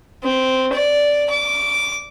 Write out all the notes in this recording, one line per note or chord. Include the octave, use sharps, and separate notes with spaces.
C4
D5
D6